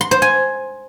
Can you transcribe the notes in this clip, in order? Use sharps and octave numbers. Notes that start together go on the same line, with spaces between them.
C6
C5
G#5